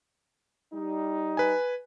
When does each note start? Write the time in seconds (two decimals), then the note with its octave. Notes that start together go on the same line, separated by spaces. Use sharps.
0.74 G3 D#4
1.37 B4 G#5